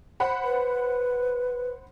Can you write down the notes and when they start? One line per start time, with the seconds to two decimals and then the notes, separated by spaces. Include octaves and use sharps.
0.20 C5 F#5 B5
0.44 B4